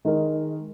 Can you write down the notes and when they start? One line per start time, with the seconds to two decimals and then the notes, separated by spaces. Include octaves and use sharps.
0.05 D#3 G#3 D#4 A#4